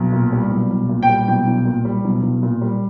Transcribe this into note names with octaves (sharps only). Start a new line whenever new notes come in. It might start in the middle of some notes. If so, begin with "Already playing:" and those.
Already playing: B1
A#2
G3
B1
B1
A#2
G5
G3
B1 G5
B1
A#2
G3
B1
B1
A#2
G3